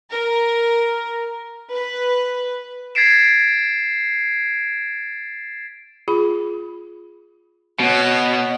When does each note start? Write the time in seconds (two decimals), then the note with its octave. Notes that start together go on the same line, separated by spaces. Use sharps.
0.12 A#4
1.72 B4
2.95 G#6 A6 B6 C7 D7 E7
6.08 F4 G#4 B5
7.80 B2 C#5 F#5